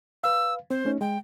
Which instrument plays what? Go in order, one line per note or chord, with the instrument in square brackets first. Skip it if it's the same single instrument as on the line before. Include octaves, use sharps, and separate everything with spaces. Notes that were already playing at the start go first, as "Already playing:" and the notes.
[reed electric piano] B4 F5 [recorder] E6
[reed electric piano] C4 [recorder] C5
[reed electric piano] A3 C#4 D#4
[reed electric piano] G#3 [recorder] G5